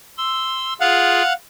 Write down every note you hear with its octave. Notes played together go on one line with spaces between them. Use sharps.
C6 E6
F4 G#4 F5 F#5